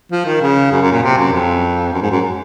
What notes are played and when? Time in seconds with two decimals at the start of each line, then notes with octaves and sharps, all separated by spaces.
0.12 F3
0.26 D#3
0.42 C#3
0.72 F#2
0.82 F#2
0.92 A#2
1.03 C3
1.18 F#2
1.32 F2
1.93 F#2
2.02 G#2
2.11 F#2